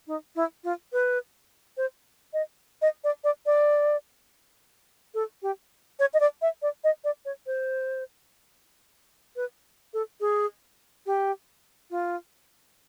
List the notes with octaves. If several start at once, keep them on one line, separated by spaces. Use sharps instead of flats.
D#4
E4
F4
B4
C5
D#5
D#5
D5
D5
D5
A4
G4
C#5
D#5
D5
E5
D5
D#5
D5
C#5
C5
B4
A4
G#4
G4
F4